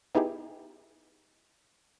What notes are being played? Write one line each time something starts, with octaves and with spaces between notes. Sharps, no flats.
B3 D#4 E4 G4 G#4